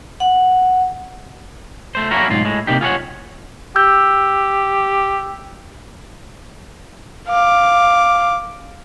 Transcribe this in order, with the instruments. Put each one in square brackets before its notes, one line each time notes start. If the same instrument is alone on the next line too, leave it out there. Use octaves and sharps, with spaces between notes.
[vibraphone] F#5
[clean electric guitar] A3 C5
A3 A#3 C#4 E4 F#4 A#4
B1 G#2 F4
A2 G#3
C3 A#3 D#4 G4
F4 G#4 C#5 F#5
[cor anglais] G4 [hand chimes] E6 G6
[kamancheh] F5 D6